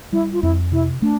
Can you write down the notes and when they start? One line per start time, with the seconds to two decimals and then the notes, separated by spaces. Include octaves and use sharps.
0.12 G3 E4
0.33 F4
0.42 F2 E4
0.72 C3 E4
1.02 A3 D4